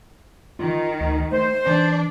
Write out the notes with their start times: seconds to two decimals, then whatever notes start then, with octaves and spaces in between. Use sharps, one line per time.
0.59 D#3 F4
1.00 D2
1.32 A3 C5
1.67 E3 D4